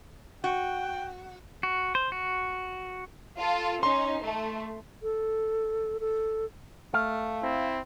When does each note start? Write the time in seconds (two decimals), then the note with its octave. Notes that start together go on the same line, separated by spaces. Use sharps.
0.44 F#4 G5
1.63 F#4
1.95 C5
2.12 F#4
3.38 F4 A4
3.83 C#4 D#4 C6
4.22 A3
5.03 A4
6.00 A4
6.94 A3 F5
7.42 C4 E4